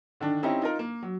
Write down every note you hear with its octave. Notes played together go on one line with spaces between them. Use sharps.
D3 D#3 D4
C4 C#4 D#4 E4 G4 A#5
D#4 F4 A#4
A#3
F#3